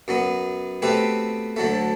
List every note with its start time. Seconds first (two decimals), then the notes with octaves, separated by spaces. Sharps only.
0.08 F#2 F#3 B3
0.82 B2 A3 C4 G4 B4
1.56 D2 D3 F#3 A3